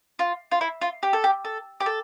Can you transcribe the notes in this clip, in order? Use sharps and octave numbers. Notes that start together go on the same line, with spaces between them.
F4
F4
E4
F4
G4
A4
G4
A4
G4
A4